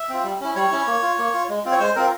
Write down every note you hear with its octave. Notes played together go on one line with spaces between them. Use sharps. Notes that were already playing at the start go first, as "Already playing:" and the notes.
Already playing: E5
C4 F4
G3
C#4 E4
G3 C#5
C#4 E4
A#3
F4
A#3
F4
G#3
C4 F4
C#5
G#3 C5
C4 F4 A#4